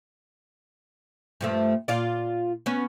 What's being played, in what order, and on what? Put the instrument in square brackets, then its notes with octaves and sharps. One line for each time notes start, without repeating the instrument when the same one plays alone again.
[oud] G2 F3 A3
A#2 F4 D5
B3 C#4